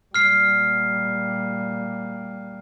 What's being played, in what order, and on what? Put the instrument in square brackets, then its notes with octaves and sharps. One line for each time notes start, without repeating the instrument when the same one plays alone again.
[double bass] A#2 G3 [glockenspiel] F6 C7